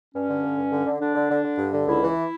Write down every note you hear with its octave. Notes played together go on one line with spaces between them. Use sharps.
G2 C#4
D3
G2
G2
D3
D3
D3 D4
D3
D3
D3
G2
D3
C#2 E4
E3